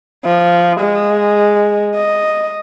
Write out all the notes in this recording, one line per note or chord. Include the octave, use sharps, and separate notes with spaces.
F3
G#3
D#5